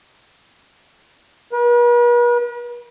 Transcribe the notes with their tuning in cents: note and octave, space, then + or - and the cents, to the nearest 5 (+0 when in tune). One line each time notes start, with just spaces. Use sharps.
B4 -45